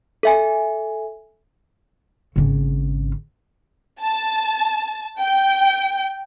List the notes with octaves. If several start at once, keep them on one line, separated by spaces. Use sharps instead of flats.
A4 E5 G#5
G#1 C#3
A5
G5